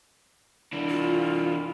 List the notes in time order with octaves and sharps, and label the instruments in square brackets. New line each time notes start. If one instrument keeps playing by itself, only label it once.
[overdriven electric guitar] E3 D4
[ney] F4